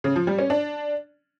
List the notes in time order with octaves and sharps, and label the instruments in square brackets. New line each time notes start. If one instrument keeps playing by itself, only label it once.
[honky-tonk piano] C#3
F3
G3
C#4
D4